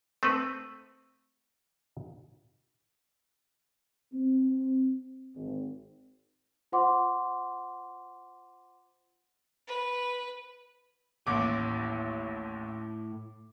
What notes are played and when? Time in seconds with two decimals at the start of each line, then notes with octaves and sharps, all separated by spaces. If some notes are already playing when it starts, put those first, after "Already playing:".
0.23 A3 C4 A4 B4
4.13 C4
5.35 G#1
6.72 F4 C5 F#5 C6 D6
9.67 B4
11.27 A1 D#2 A2 D6